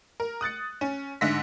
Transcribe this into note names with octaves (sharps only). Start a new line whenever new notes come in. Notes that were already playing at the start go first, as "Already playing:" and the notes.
A#4
D#6 F#6 A6 C#7
C#4
G#2 D3 E5 A#6 B6